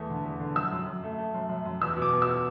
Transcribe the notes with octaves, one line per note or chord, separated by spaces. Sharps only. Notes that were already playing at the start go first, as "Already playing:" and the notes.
Already playing: E2 A3
D3
E2
D3
F#2 E6
F#2
F#2
A3
A3
F#2
F#2
F#2
E2 E6
B2
D6
B2
E6